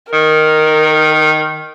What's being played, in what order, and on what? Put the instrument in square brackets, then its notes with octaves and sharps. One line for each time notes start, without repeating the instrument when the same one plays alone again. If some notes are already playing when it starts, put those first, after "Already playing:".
[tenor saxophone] D#3 [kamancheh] A#4